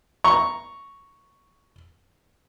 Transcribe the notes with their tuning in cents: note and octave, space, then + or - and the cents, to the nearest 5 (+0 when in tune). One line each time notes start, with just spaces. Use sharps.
A#5 +0 C#6 +0